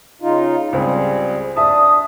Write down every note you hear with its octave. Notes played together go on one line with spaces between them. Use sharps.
C#3 D#4 F4
C#2 G3 C4 G#4
D4 E5 A5 D#6